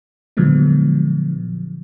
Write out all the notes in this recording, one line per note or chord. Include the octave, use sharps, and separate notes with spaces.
A#2 D3 F3 F#3 G#3 B3